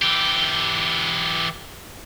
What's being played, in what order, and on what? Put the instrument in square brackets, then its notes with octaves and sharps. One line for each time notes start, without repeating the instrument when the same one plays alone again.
[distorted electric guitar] E3 G4